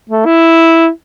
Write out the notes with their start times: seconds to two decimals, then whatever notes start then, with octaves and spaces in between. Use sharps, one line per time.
0.10 A3
0.26 E4